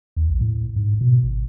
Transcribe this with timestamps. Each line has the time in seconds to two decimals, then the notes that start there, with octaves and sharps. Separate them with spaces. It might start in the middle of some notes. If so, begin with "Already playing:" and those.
0.16 D#2
0.30 A#1
0.41 A2
0.76 G#2
1.01 B2
1.23 G#1